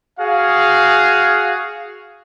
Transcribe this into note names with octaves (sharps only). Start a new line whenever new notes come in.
F#4 G#4 F5